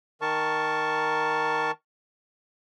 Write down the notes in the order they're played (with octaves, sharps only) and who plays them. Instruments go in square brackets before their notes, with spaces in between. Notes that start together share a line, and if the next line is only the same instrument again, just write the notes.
[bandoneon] D#3 A#4 A5 C#6